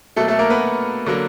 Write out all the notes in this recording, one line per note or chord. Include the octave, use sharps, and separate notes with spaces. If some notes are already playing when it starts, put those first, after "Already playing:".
B2 F#3 A3 A#3 A4
A3 A4
A#3 A#4
B3 B4
D3 F#3 A#3